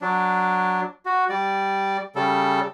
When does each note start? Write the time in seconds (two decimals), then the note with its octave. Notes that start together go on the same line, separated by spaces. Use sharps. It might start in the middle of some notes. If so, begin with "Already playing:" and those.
0.01 F#3 D4
1.05 F#4
1.30 G3 D5
2.16 C#3 G3 A4